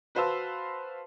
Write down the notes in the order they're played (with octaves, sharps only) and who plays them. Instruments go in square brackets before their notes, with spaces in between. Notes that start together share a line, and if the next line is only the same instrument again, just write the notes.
[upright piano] F#4 B4 C5 F5 A5 E6